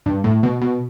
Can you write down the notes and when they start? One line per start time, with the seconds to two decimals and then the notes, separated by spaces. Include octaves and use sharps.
0.06 G2
0.24 A2
0.43 B2
0.62 B2